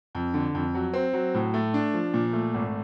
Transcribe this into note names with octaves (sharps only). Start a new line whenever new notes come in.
F2
D3
F2
F#3
C4
F#3
A2
A3
D4
F3
A#2
A3
G#1